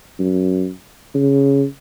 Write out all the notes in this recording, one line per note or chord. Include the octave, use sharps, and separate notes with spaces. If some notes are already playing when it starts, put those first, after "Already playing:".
F#2
C#3